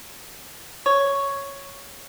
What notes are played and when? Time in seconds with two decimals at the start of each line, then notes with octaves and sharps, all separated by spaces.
0.86 C#5